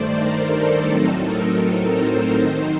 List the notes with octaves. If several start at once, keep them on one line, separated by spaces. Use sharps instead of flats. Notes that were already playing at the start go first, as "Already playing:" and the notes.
Already playing: G2 D#3 A3 C5 D5
A#4
A4
A2 F#3 C4 D#4 A4
A#4
C5
D#3 F#3 C4 D#4 C5